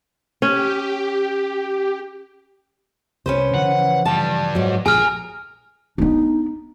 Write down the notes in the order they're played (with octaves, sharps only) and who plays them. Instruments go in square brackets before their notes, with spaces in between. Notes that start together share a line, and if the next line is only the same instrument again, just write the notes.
[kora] C#4 [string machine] G4
[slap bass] C2 [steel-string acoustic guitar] C#4 B4 C5
[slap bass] C#3 E3 F3 [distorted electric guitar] F#5
[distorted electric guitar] G2 G3 [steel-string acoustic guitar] A5
[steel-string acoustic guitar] G#2 F#3
[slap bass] A#1 D3 F3 [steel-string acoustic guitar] G#4 [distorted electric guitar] A#4 [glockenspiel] G#5 F6
[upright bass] B3 D4 [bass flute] D#4